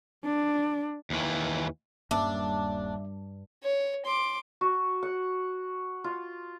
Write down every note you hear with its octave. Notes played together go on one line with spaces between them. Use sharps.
D4
D#2 E3
D#1 G2 A#3 C#4 D4 E5 D6
C#5
C6 D6
F#4
F#5
F4